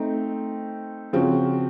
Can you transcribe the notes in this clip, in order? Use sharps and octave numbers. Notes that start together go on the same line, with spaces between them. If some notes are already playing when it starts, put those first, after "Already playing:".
Already playing: A3 C4 D#4
C#3 F3 C4 F#4